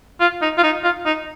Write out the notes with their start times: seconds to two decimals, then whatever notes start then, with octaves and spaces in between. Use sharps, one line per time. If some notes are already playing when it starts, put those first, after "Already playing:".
0.20 F4
0.42 D#4
0.58 F4
0.64 D#4
0.84 F4
1.06 D#4